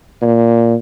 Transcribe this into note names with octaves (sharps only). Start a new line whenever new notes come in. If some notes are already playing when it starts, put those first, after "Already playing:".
A#2